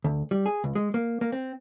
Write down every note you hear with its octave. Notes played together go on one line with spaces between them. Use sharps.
D2
G3
G#4
C#2
G#3
A#3
A#3
C4